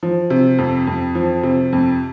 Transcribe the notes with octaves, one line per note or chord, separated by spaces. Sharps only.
F3
C3
F2
F2
F3
C3
F2